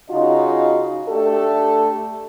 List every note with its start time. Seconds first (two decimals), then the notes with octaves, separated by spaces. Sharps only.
0.10 C#3 D#4 F4 F#4 D#5
1.08 A3 D4 G4 A4